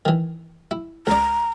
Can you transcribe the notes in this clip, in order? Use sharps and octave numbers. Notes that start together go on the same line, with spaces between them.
D#3 E3
E4
C#2 D5 A#5